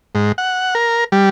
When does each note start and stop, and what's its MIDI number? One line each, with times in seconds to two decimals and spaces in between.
0.15 0.32 44
0.38 0.74 78
0.75 1.04 70
1.12 1.29 55